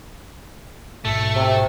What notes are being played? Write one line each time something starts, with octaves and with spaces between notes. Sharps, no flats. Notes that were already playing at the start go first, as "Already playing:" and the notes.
A1 G#2 B2 A3
C3